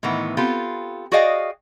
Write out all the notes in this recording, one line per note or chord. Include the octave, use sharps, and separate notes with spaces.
A2 D#3 E3 B3
B3 C4 F4 G4 A4
F#4 G#4 D5 D#5 F5 G5